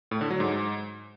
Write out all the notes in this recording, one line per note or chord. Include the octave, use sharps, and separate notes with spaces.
A2
D3
F#3
G#2